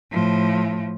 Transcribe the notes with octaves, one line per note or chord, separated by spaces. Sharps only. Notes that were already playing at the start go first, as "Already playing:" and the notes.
A2 F3